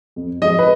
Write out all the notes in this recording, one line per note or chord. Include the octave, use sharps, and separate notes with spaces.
F2
F3 G#3 D#5
B4